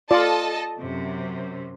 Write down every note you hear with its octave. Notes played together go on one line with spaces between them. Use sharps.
F4 A4 D5 D#5 A5
F#2 C3